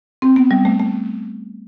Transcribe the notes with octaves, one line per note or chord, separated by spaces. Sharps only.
C4
B3
G3
A3
A3